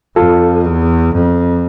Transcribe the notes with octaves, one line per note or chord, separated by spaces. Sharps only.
F2 F4 A4
E2
F2